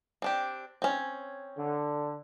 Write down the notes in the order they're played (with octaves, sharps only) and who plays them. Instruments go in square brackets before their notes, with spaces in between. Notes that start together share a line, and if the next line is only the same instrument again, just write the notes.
[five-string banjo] C4 D4 G4
C4 C#4
[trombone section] D3